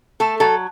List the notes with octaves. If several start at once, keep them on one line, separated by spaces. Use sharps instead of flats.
A3 A4
F#3 A4